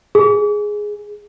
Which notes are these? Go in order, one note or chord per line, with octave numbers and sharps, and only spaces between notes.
G#4